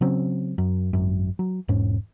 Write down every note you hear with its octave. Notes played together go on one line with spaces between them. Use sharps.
C#3 F#3 C4 C#4
F#2
G#1 F#2
F#3
E1 G#2 C#4